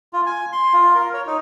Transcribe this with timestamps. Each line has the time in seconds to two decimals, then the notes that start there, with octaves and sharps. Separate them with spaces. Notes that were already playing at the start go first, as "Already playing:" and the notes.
0.13 F4
0.26 G#5
0.52 C6
0.73 F4
0.95 A#4
1.14 C#5
1.27 D#4